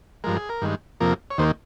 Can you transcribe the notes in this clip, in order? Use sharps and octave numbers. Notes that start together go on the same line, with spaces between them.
G2 F3 G#3 A#4
G#4
A#4
G2 D#3 G#3
F2 C3 F3 A#3 A#4
C#5
D#2 D#3 A#3 C5